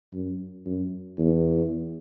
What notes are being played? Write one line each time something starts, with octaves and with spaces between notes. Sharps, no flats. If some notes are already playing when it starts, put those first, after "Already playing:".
F#2
F#2
E2